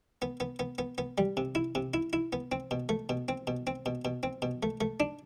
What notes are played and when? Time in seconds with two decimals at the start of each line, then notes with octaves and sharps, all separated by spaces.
0.22 B3
0.40 B3
0.59 B3
0.78 B3
0.98 B3
1.18 G3
1.37 C3
1.55 E4
1.75 C3
1.94 E4
2.13 E4
2.33 B3
2.52 C4
2.71 B2
2.89 A3
3.09 B2
3.28 C4
3.47 B2
3.67 C4
3.86 B2
4.05 B2
4.23 C4
4.42 B2
4.63 A3
4.81 A3
5.00 D4